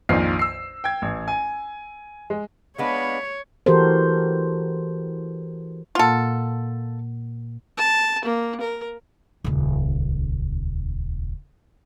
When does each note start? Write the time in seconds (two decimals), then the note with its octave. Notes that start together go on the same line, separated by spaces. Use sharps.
0.09 A#1 F2 A#2 D#3 F4 C7
0.39 E6 C7
0.84 G5 G#6
1.02 A1
1.28 G#5
2.30 G#3
2.78 G#3 B3 D4 C#5 D#5 F5 B5
3.66 E3 F#4 G4 A4 A#4 C5
5.95 A#2 A#3 F4 A4 F#5
7.77 A5
8.25 A#3
8.60 A#4
9.44 D#1 C#2